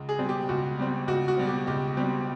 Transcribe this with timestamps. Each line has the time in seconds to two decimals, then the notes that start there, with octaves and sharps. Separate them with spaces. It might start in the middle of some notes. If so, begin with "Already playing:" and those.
Already playing: C#2
0.09 G#4
0.19 B2 G3 C4
0.29 G4
0.49 C#2 F#4
0.79 B2 G3 C4
1.07 C#2 F#4
1.28 F#4
1.37 B2 G3 C4
1.47 G4
1.67 C#2 G4
1.97 B2 G3 C4